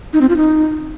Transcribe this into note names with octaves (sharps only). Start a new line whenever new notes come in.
D#4
C4
F4
D#4